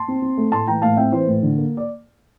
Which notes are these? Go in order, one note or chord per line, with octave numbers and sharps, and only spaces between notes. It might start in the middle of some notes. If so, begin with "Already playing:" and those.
Already playing: A5 C6
C4
C4
A3
A2 A5 C6
E3 G5 A#5
A2 F5 A5
C4 E5 G5
E3 C5
A2
D3
A#3
D5